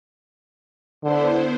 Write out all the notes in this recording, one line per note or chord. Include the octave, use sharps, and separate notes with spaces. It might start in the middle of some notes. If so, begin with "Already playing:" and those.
D3 B3 E4 C5